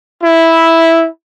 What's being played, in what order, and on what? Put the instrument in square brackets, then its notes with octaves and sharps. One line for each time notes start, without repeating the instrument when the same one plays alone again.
[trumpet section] E4